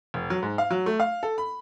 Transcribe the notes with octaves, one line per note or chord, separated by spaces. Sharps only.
F1
F#3
G#2
F5
F#3
A3
F5
A4
B5